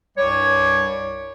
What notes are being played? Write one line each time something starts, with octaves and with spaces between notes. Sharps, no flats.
C2 G2 G3 C#5